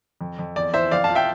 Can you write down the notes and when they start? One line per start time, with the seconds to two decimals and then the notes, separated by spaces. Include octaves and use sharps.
0.21 F2
0.39 F2
0.56 E2 D5
0.74 E3 C5 E5
0.91 F2 D5 F5
1.04 F5 A5
1.10 F3
1.15 E5 G5